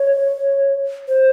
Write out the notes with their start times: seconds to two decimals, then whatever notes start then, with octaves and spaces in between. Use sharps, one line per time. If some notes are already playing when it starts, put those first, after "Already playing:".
Already playing: C#5
1.08 C5